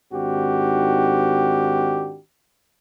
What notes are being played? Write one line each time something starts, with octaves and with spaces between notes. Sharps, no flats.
G#2 D#3 C4 D4 F#4 G4